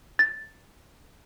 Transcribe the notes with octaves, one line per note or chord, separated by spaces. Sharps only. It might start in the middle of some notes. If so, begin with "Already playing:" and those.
A6